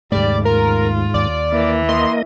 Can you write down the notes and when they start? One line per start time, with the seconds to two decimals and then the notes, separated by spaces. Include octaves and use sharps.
0.12 D#2 G#2 C#3 G3 A3 D5
0.45 F4 A#4
1.14 D#2 D5
1.52 E3 A#3
1.89 A#3 D#5 C6